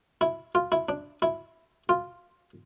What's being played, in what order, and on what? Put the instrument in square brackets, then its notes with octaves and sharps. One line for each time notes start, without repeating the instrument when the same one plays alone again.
[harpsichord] E4
F4
E4
D4
E4
F4